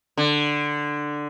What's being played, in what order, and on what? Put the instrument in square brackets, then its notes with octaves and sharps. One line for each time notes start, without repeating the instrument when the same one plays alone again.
[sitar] D3